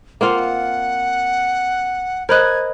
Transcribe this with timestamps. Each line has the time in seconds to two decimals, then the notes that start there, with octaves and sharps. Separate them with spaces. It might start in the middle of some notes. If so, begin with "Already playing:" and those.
0.21 A#3 C4 F4 F#5
2.29 A#4 C5 D#5 B5 F#6 G#6